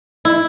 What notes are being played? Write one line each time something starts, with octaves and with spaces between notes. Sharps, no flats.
E4